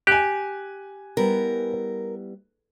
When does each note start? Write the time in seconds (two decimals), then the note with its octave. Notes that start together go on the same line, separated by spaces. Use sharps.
0.07 G4 G#5 F#6
1.17 G3 B3 E4 A#4